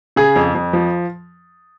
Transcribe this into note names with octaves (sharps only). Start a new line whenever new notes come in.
C#3 G#4
F2
F2
F3